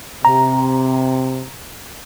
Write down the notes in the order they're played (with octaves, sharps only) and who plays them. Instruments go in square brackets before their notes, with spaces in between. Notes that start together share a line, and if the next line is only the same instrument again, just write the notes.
[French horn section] C3 [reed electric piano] A#5